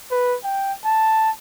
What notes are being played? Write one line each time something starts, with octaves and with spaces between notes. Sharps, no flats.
B4
G5
A5